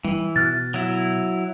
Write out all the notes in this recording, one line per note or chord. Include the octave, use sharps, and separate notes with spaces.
E3 G3
B2 F6 F#6 A6
F#3 E4